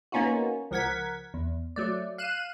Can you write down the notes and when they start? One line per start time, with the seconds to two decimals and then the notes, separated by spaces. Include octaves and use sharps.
0.12 A#3 B3 C#4 D#4 F4 F#4
0.71 C#2 F3 A#4 F#5 G#6 B6
1.34 E2
1.76 F#3 A3 D5
2.18 F5 F#6 D#7 E7